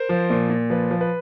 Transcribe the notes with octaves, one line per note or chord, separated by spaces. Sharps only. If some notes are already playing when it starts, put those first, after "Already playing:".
Already playing: A#4 C5
F3
A#2
A#2
F3 B4
F3
B4